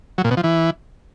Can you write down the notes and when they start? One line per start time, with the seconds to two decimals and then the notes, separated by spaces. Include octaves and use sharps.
0.18 F#3
0.24 A#2
0.31 B2
0.37 F3
0.44 E3